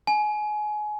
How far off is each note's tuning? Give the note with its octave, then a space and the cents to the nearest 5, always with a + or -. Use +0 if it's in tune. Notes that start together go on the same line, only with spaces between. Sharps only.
G#5 +25